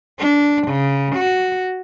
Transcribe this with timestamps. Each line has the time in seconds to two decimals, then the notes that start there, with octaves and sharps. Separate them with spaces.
0.19 D4
0.68 C#3
1.16 F#4